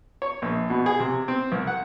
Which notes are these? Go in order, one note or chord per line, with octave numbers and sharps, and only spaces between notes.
C#5
A#1
B2
G#4
C3
C4
C2
F#5